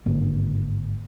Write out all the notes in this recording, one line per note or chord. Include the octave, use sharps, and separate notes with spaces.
G#1 G2 D3 A#3